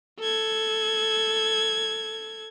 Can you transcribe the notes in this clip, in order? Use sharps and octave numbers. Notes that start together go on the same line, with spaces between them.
A4 G#6